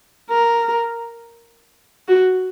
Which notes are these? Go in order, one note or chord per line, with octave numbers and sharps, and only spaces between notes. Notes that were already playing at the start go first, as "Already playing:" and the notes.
A#4
F#4